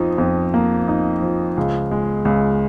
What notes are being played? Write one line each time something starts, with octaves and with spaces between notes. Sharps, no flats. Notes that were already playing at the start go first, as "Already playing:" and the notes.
Already playing: F2 F3 D#4
F2
A#3
D#4
F3
C#2
G#3
C#2